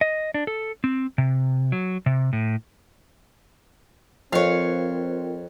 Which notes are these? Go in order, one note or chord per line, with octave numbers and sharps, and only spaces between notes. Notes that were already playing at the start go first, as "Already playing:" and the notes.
D#5
D4
A4
C4
C3
F#3
C3
A2
F2 C4 F4 A#4 C#5 F5